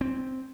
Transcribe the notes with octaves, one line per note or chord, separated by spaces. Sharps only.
C4